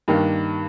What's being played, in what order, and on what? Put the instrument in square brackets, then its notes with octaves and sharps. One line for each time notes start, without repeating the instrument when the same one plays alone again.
[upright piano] G2 D#3 A#3 D4